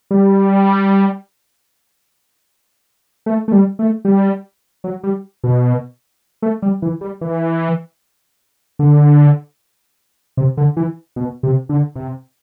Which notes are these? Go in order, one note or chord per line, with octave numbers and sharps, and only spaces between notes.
G3
A3
A3
G3
A3
G3
F#3
G3
B2
A3
G3
E3
G3
E3
D3
C3
D3
E3
B2
C3
D3
C3